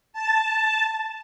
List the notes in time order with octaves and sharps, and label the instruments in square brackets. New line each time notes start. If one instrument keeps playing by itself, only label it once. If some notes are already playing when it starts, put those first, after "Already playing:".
[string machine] A5